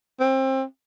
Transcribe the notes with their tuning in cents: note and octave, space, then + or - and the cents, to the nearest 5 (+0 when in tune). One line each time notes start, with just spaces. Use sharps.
C4 +25